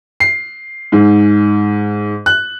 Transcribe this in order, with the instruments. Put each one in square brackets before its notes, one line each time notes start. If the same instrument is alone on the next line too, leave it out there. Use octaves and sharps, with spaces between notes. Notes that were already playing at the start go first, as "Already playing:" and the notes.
[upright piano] C7
G#2
F#6